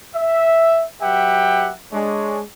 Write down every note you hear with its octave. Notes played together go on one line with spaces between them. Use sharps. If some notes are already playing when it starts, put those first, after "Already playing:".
E5
F#3 G4 B4 E5 F#5 G5
G#3 D4 C#5